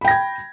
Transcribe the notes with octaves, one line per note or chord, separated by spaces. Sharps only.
G5 B5 G#6 A#6